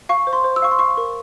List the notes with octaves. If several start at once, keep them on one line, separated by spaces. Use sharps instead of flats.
F5 C#6
C5
C6
C5
E6
F5 C#6
C6
F5 C#6
A#4